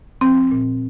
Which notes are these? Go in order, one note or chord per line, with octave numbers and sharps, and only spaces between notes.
F3 C4
A#2